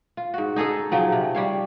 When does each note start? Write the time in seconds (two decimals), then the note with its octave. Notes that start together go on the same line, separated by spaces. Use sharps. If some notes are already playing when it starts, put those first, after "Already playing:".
0.17 F4
0.34 G#2 F#4
0.56 D#4 G#4 A4 D#5
0.91 C#3 F3 F#3 C4
1.12 C3
1.35 G3 C#5 F5